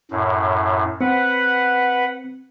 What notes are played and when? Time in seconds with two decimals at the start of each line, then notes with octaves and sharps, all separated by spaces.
0.11 F#2 A2
1.01 C4 B4 F#5